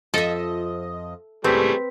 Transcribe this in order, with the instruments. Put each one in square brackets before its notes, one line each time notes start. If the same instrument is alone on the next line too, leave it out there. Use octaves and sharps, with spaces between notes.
[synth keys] F2 F3 D#5 [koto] A4 E5
[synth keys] C#2 A2 [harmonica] G3 A3 G#4 [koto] C4 [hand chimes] B4 B6